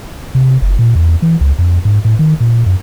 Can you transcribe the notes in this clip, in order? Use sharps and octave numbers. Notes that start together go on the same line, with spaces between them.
C3
F#1
A#2
E2
E3
C#2
F2
G#2
A2
D#3
A#2
F#2